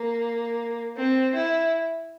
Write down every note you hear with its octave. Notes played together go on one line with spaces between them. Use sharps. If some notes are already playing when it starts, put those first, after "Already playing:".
Already playing: A#3
C4
E4